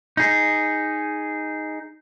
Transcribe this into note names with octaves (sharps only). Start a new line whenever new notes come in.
D#4 G#4